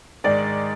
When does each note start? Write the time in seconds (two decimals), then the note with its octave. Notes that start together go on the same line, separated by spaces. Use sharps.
0.24 G#2 D#3 G#3 D#4 D5